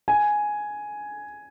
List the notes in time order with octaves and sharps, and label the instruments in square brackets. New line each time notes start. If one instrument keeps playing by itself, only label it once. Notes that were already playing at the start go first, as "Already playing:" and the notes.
[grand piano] G#5